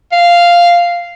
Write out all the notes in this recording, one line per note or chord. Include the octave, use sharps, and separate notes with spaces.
F5